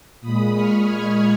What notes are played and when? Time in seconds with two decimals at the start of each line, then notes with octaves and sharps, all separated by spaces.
0.21 A#2 G#3 B5 D#6
0.53 C#6 F6
0.84 F6 G#6